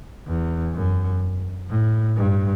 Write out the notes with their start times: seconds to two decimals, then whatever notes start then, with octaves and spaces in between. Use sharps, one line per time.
0.27 E2
0.74 F#2
1.70 A2
2.17 G2